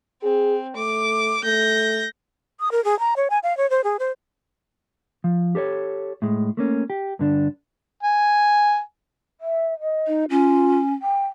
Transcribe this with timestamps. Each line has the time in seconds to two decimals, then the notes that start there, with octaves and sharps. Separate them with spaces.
0.23 C4 G#4
0.76 A3 D6
1.44 A3 G6 A#6
2.60 D#6
2.72 A#4
2.85 G#4
3.00 A#5
3.16 C#5
3.30 G#5
3.43 F5
3.57 C#5
3.70 C5
3.84 G#4
3.99 C5
5.24 F3
5.55 G4 A4 C5 C#5
6.22 A2 G#3
6.57 A3 A#3 C#4
6.90 G4
7.19 G2 D3 D4
8.03 G#5
9.41 E5
9.81 D#5
10.07 D#4
10.30 C#4 F4
11.02 G5